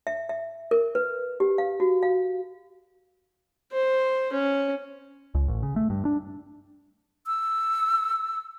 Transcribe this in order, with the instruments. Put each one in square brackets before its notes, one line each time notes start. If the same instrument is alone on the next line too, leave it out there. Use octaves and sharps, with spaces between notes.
[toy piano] E5
E5
A#4
B4
G4
F5
F#4
F5
[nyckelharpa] C5
C#4
[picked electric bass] C#2
A1
C#3
A3
G2
D4
[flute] E6